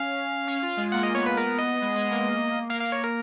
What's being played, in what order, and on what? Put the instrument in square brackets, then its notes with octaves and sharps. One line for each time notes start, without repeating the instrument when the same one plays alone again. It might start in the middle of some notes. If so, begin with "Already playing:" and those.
Already playing: [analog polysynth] C#4 [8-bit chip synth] F5
[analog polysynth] C#4
F4
G#3
[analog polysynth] A#3 [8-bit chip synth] F#5
[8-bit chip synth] D#5
[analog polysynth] B3 [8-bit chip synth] C#5
[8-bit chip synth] B4
[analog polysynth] B3 [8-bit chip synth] A#4
[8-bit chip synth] D#5
[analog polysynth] G#3
G#3
A#3
[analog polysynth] A#3 [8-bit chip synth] F5
[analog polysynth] A#3 [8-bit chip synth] F5
[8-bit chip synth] C#5
A#4